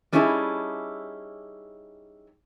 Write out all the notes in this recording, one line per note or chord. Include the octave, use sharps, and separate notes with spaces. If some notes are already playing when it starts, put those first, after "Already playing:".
G3 C#4 D#4 E4 G#4 A4